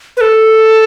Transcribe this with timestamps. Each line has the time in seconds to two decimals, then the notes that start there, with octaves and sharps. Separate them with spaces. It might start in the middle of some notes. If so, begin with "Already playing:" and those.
0.17 B4
0.21 A4